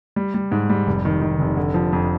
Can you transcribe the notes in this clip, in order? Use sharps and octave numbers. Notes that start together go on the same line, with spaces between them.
G3
G3
G#2
G3
F1
D#3
D#3
F1
D3
F3
F2